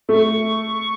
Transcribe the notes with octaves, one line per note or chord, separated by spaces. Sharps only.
A3 C#6